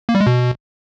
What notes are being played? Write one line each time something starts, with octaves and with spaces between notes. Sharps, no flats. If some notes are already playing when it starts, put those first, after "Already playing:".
A#3
G3
G#3
B2